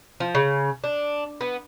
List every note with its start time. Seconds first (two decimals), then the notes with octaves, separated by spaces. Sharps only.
0.20 F3
0.35 C#3
0.84 D4
1.41 B3